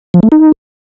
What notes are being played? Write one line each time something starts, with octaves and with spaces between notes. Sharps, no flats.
F3
A3
D#4